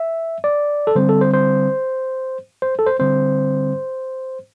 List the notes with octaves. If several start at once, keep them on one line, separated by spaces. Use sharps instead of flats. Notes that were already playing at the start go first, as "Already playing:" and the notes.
Already playing: E5
D5
A4
D3 G3 C4 C5
A4
C5
C5
C5
A4
C5
D3 G3 C4 C5